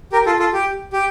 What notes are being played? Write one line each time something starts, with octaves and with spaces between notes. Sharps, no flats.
G4 A#4
F4 A4
F4 A4
G4
G4